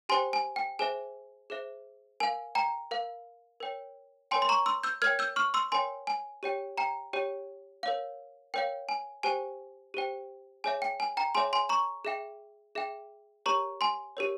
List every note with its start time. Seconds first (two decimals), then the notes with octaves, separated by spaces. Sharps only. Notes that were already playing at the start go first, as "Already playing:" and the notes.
0.09 G4 C5 G5 G#5 C6
0.33 G#5
0.56 G5
0.79 G#4 C5 E5 G#5
1.50 G#4 C5 E5
2.20 A#4 F5 G#5
2.55 G5 A#5
2.91 A#4 F5
3.60 A#4 C#5 G5
4.31 A#4 C#5 G5 G#5 C6
4.42 C6
4.49 A#5 C#6
4.66 C6 E6
4.83 E6 G6
5.02 A#4 C#5 G5 F6 G#6
5.19 E6 G6
5.36 C#6 F6
5.54 C6 E6
5.72 A#4 C#5 G5 G#5 C6
6.07 G#5
6.43 G4 C#5 G5
6.78 G5 A#5
7.13 G4 C#5 G5
7.83 A#4 C#5 F5
8.54 A#4 C#5 F5 G5
8.89 G#5
9.23 G4 C5 G5 G#5
9.94 G4 C5 G5
10.64 G#4 C#5 E5 G#5
10.82 G5
11.00 G#5
11.17 G5 A#5
11.35 G#4 C#5 E5 G#5 C6
11.53 G#5 C6
11.69 A#5 C#6
12.05 G#4 E5 G5
12.75 G#4 E5 G5
13.46 G4 A#4 C#5 A#5 C#6
13.81 G#5 C6
14.17 G4 A#4 C#5